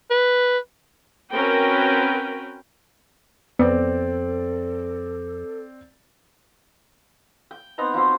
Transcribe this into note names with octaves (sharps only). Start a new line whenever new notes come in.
B4
C4 C#4 F#4 A#4 B4 G5
F2 B3 C4 A4 D5
G5
B3 C4 D#4 A#5
F3 F#3 C4